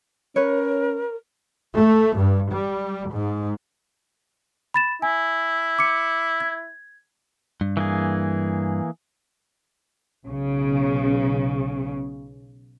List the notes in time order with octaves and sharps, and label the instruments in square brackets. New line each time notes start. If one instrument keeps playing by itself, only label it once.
[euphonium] C#4 [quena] A#4 [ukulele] B4 C#5
[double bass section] A3
G2
G3
G#2
[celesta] B5 A6 E7
[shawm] E4 [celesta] G#5
[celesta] D6 C#7
G#6
[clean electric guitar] G2
[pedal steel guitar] E3 A#3 G#4
[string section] B1 C#3